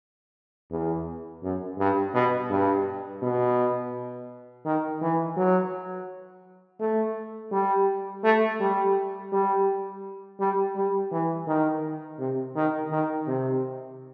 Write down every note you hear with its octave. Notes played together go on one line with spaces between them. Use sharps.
E2
F#2
G2
B2
G2
B2
D#3
E3
F#3
A3
G3
A3
G3
G3
G3
G3
E3
D#3
C3
D#3
D#3
C3